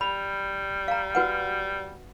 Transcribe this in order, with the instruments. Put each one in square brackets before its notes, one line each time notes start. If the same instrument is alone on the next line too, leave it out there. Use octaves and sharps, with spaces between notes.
[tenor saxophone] G3 [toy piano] B5
[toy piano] F5 A#5
F#4 B4 F#5